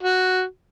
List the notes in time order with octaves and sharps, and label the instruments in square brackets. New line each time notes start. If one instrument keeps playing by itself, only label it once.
[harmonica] F#4